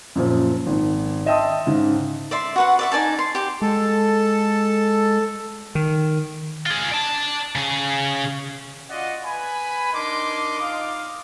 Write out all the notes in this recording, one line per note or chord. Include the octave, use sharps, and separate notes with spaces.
F#2 A#2 F3
G#1 D#3
D#5 E5 G5 A5 C6 D#6
G#2 C#3
D5 E5 C6
F#4 B4 F#5
D5 E5 C#6
D#4 D5 G#5 A5
C6
G4 D6
G#3 A4
D#3
F4 G#4
D5 A5
C#3 G#4
F4 F#4 D5 D#5 F#5
B4 G#5 B5
D4 D#4 A#4 D#5 C6 D6
D#4 F4 D#5 F5 D6